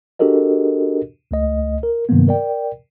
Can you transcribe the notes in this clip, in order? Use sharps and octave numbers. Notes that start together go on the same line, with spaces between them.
D4 F#4 G4 A4 A#4 D#5
C#2 A3 D#5
A#4
G2 C3 D#3 F#3 A#3 B3
A#4 D5 G5